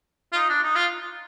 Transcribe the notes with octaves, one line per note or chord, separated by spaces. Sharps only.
F4
D#4
D4
D#4
F4